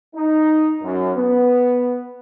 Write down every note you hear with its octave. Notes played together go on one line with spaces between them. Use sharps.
D#4
F#2
B3